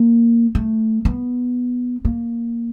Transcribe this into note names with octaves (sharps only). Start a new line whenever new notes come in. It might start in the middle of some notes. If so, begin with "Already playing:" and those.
Already playing: A#3
A3
B3
A#3